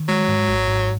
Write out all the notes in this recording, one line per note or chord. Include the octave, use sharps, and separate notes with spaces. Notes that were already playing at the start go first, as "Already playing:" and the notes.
Already playing: D#3
F#3 G#3
G#2
G#1
G#2